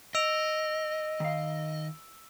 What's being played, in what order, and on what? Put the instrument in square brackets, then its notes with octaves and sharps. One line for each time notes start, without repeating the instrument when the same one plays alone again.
[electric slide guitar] D#5 [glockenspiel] E6 D7 F7
[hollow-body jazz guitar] D#3 F5